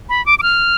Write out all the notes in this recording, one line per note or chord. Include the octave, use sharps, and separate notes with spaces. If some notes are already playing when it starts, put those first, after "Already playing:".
B5
D6
D6
F6